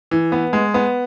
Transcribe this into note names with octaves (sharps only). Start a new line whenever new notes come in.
E3
B3
G#3
B3